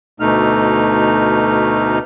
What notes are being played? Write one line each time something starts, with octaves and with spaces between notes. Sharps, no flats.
D2 B2 A3 D#4 F6